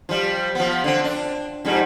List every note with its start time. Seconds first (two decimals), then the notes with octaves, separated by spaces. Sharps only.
0.09 F3 G3
0.55 F3 B3
0.84 D3 C4
1.04 D4
1.65 F2 G#2 G3